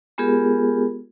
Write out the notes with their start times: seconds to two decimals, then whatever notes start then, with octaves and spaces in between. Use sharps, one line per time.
0.18 G#3 B3 F4 G4 G#4 A#4